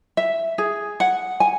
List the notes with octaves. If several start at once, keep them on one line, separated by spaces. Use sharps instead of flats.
E5
G#4
F#5
G#5